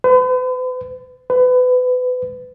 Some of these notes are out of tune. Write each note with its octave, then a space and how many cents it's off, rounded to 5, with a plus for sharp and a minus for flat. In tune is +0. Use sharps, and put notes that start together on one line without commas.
B4 +45
B4 +30